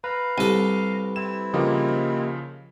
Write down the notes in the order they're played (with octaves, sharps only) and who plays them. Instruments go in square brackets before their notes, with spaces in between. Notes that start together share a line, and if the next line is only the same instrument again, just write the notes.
[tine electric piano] B4 [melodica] F5 A#5
[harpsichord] C2 A4 [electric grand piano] D#7
[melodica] C4 E4 [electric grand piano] E7
[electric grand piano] C#3 F3 [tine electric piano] A#3 G4 D#5